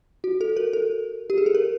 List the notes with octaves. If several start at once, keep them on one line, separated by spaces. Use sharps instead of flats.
F#4
A4
A#4
A4
G4
G#4
A4
A#4